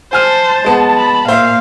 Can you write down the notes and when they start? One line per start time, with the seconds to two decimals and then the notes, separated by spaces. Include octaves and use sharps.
0.13 C5 G#5 A5 F6 D#7
0.64 G#3 B3
0.98 B5
1.28 A#2 C5 E5 F5